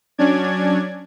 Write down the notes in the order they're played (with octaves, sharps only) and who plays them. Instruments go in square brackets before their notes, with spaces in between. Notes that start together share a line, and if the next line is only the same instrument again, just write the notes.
[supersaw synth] F#3 C#4 D4 D5 G#6